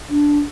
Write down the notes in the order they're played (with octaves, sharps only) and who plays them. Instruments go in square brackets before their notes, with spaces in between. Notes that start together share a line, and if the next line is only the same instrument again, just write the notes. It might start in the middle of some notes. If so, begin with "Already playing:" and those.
[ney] D4